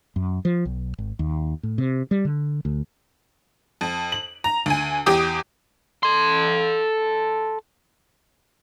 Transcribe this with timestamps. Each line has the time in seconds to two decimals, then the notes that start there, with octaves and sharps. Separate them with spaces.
0.16 F#2
0.45 F3
0.65 B1
0.98 G#1
1.19 D#2
1.63 A2
1.78 C3
2.11 G3
2.25 D3
2.65 D2
3.81 F2
4.12 F#7
4.44 A#5
4.66 D2 G#5
5.06 E2 G4 D6 D#6
6.03 A4 C6